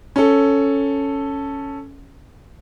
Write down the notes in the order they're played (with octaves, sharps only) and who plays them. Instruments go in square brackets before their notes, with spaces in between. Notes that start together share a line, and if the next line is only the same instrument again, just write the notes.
[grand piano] C#4 A4